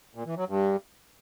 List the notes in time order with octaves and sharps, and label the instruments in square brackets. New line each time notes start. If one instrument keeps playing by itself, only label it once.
[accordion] A#2
E3
F#3
G2